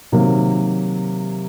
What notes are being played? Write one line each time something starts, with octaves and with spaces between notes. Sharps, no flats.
C3 D#3 F#3 A#3